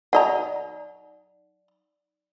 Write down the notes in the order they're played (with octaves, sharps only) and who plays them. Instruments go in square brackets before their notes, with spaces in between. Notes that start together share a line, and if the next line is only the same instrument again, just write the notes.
[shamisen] F#3 D#5 A#5 [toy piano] D#4 D5 F#5